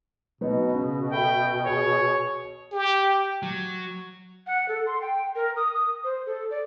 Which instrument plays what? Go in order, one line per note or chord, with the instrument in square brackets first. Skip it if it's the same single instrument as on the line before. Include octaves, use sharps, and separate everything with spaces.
[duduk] B2 [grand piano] F#3 B3 D#4
[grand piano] C#3
[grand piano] A4 E5 B5 [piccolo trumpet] G5
[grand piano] F#4 G#4 [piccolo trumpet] C#5
[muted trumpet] G4
[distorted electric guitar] F#3
[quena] F#5
A4
C6
G5
A#4
D#6
D#6
C5
A4
D5